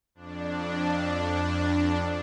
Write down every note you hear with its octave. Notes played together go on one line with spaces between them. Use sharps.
F2 D4